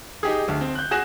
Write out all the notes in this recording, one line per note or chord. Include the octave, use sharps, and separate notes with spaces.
D#4 G4 G#4
D2
C4
F#6 G6
F#4 G#4 G#5 F#6 A#6 E7